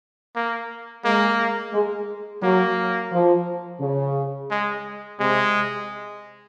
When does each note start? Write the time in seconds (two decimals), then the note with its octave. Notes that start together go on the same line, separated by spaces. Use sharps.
0.36 A#3
1.05 G#3 A#3
1.73 G#3
2.43 F#3 A#3
3.13 F3
3.81 C#3
4.51 G#3
5.20 C3 G#3